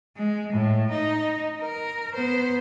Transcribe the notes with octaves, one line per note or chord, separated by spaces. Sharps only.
G#3
A2
D#4
A#4
B3 C5